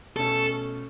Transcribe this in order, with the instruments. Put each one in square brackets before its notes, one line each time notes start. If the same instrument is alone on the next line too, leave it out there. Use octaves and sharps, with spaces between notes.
[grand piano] B2 A3 C#4 [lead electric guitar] A4